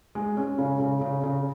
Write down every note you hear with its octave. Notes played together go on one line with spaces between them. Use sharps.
G#3
C#4
C#3
C#3
C#3
C#3